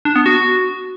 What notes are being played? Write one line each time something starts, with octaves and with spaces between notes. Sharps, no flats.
D4
B3
F#4